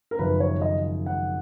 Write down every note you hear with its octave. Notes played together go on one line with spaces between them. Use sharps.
A#4
G#1 F#2 C#3 F3 B4
C#5
D#5
F#5